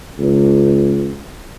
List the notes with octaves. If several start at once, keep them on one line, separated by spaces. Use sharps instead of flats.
C#2